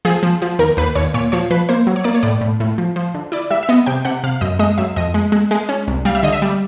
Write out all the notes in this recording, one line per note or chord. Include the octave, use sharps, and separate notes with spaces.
F3 G#4
F3
F3
D#2 A#4
D#2 B4
D#2 C#5
A#2 C#5
F3 C#5
F3 B4
A#3 C5
F#3
C#5
A#3 D5
C#5
A2 D5
A2
A2
F3
F3
D3
E4 D5
G3 E5
E5
B3 D#5
C3 G5
C3 F#5
C3 F5
F#2 D#5
G#3 D#5
F#2 E5
F2 D#5
G#3
G#3
G#3
C#4
C2
G3 F5
E5
D3 D#5
E5
G3